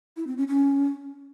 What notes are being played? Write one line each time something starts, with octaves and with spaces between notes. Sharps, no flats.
E4
C4
C#4
C#4